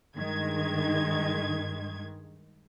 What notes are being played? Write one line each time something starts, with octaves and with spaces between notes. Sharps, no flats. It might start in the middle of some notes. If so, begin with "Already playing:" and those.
G2 D#3 G#3 G#6